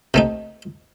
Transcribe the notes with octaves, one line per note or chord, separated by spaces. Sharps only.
C3 A3 D#4